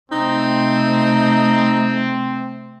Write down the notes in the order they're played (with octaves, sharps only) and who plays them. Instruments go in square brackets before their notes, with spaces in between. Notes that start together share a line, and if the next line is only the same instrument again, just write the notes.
[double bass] C3 A3 [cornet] C4 [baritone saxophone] D#4